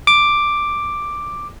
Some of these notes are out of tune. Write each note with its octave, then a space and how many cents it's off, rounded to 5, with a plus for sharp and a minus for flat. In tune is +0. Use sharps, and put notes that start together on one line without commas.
D6 +5